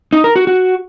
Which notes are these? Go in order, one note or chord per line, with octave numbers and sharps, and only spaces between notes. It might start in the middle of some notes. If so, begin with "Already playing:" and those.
D#4
A#4
F#4
F#4